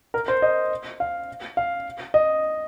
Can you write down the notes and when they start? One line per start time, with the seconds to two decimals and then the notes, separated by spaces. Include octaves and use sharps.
0.14 A#4
0.28 C5
0.42 D#5
1.00 F5
1.57 F5
2.14 D#5